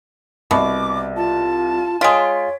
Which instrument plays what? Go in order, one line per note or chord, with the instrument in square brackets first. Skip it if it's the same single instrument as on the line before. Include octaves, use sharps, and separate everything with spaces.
[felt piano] C2 [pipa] B2 [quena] D6
[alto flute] F4 [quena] A5
[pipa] G#3 F4 [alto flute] C#5 [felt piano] C6 B6 D7